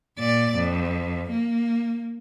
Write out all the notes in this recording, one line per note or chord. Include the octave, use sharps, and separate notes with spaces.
A#2 D5
F2
A#3